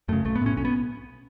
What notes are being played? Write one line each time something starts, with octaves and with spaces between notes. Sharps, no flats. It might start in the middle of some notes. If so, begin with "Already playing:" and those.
F#2 C#3 A3
B1 A3
B3
A2 C#4
B1 C#4
B3